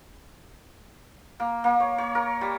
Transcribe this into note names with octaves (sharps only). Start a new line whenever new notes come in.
A#3
A#3
C#5
C#5
A#4
G3